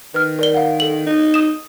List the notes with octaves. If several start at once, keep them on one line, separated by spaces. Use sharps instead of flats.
D#3 B4 F6
A#4 D5 G7
F5 F#5
A4 F#7
D#4
D#6 E7